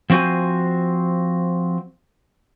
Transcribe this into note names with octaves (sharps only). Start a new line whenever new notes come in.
F3 C4 F#4 C5 G#5